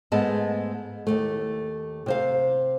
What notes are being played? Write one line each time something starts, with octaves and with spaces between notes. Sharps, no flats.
G#2 G#3 A3 B3 D#5 A5
D#2 G#2 A3
C3 C5 F5